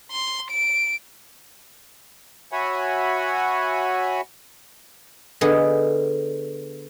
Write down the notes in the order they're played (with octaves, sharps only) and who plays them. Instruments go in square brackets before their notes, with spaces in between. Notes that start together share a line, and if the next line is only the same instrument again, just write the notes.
[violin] C6
D7
[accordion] F#4 C#5 E5 F#5 G#5 B5
[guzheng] D3 B3 G#4 D#5